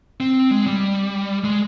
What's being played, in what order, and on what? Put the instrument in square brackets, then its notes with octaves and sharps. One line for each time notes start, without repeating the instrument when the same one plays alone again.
[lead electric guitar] C4
G#3
G3
G#3